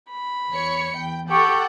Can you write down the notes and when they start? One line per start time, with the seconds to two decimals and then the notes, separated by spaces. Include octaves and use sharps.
0.11 B5
0.51 E2 C#5 C#7
0.94 E2 G5
1.29 G4 A4 F#5 G5 C#6